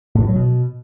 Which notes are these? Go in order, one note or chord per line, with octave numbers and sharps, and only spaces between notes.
A2
G2
F#3
B2